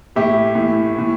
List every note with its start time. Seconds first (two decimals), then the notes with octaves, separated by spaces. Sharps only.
0.15 A2 E3 E4 G4
0.55 A2 E3
0.94 A2 E3